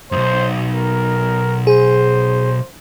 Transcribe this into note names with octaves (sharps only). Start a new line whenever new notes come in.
B1 F#2 C5
A#4
G#4 C5